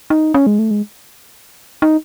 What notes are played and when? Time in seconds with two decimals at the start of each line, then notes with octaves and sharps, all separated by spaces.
0.10 D#4
0.34 C#4
0.47 G#3
0.59 A3
0.71 G#3
1.82 D#4